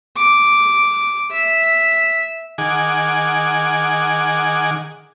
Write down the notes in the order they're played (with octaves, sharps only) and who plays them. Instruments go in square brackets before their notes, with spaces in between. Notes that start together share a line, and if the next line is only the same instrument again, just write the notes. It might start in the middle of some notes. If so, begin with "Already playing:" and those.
[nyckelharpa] D6
E5
[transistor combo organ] D#3 G#4 F#5 G#5 D6